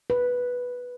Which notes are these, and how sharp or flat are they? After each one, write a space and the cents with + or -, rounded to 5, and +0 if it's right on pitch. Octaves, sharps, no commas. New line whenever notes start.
B4 -5